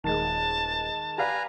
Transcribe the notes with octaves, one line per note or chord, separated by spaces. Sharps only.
D#1 D#3 G#3 A5
G4 B4 D5 F5 G#5 A#5